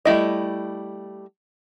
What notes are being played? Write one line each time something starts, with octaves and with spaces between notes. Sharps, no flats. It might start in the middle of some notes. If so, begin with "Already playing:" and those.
G3 A3 E4 D#5